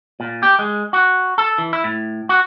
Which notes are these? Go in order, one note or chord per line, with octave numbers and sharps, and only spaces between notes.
A#2
G4
G#3
F#4
A4
E3
E4
A2
F#4